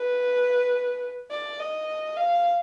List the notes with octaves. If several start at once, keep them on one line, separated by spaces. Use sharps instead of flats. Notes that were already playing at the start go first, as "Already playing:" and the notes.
Already playing: B4
D5
D#5
F5